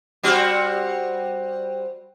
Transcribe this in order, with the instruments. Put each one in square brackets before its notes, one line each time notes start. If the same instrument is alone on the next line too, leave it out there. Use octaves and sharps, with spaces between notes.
[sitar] G3 C4 F#4